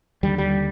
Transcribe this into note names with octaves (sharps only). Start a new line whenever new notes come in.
D#2 D3 G3
G3